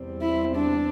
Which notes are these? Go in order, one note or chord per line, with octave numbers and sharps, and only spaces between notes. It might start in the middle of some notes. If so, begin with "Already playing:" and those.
Already playing: E2 C3 G3 C4
E4
D4